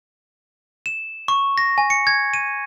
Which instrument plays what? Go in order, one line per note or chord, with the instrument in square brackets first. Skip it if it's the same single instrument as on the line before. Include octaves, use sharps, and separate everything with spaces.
[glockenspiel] E7
C#6
A#6
G#5
C#7
G#6
D#7